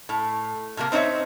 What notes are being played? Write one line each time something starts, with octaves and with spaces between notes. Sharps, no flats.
A2
A2 C3 G3 A#3
C4 D#4 B4 C#5 E5